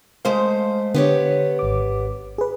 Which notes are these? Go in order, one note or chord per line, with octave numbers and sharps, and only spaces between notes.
G#3 A3 C5 F5 C6
D3 B3 G4 C#5
G#1 D6
G#4 B4